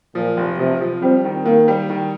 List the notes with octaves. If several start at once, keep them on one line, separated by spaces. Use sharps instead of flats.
A#2 F3
F1
C3 F3
F3
G3 C4
D#3
D#3 A#3
G3
D#3